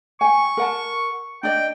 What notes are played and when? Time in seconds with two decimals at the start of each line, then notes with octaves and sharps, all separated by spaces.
0.21 G5 G#5 C#6
0.57 A#4 F#5 A5
1.43 D4 D5 D#5 G5